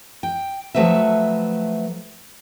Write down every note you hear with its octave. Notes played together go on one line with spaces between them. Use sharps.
G5
F3 F#3 A3 B4 E5